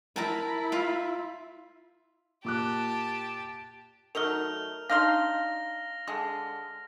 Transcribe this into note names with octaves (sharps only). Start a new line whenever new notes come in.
E4 A#4 A5 A#5
F4 E5
A#2 G4 A5 D6 F#6
F#3 A3 D#4 A#4 F6 F7 G7
D4 D#4 F5 C6 F6 A#6
D3 G#3 A5